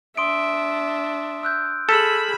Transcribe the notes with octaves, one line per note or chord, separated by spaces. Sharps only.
D4 E5 C6 D#6 D7
E6 F#6 G6
G#4 A4 B5 F6 B6 E7